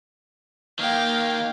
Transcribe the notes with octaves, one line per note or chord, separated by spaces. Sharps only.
D#3 A#3 F5 G5